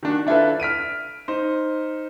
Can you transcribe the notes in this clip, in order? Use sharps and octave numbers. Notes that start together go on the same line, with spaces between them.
D#3 D4 F#4
D4 E4 F4 A4 B4
F6 B6 D7 D#7
D#4 C5